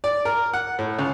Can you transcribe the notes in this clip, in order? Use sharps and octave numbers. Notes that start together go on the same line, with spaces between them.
D5
A#4
F#5
A2
C#2